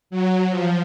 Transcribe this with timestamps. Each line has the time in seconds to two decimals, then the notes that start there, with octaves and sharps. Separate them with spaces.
0.10 F#3
0.49 F3